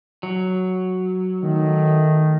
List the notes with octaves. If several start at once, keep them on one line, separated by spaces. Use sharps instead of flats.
F#3
D#3 A3